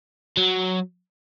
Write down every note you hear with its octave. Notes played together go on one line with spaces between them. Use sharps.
F#3